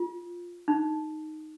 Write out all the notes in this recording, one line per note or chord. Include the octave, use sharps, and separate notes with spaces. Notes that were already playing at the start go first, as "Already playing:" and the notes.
Already playing: F4
D#4